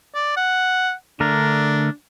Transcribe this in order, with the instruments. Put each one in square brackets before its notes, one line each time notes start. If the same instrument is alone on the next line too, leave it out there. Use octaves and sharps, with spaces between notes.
[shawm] D5
F#5
[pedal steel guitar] D3 A3 A#4 [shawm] D4